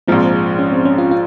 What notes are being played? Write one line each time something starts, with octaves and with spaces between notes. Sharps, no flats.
A#1 G#2 F3 C4
C#4
C4
C#4
F4
F4